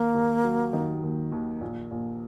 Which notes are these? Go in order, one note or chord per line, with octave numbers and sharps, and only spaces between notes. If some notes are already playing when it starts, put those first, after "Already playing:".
Already playing: D#2 A#3
D#2
F#3
D#3
D#2
D#2
A#1
A#1